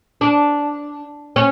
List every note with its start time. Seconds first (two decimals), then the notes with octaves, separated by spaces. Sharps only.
0.21 D4
1.36 C#4